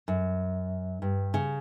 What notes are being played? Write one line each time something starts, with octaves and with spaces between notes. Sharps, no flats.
F#2
G2
C#3